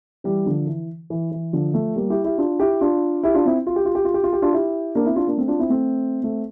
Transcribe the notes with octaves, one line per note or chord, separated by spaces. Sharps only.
E3 G3
D3 F3
E3
E3
E3
D3 F3
F3 A3
G3 A#3
E4 G4
E4 G4
D4 F4
E4 G4
D4 F4
E4 G4
D4 F4
C4 E4
F4
G4
F4
G4
F4
G4
F4
G4
D4 F4
E4 G4
A#3 D4
C4 E4
D4 F4
A#3 D4
A3 C4
D4 F4
C4 E4
A3 C4
A3 C4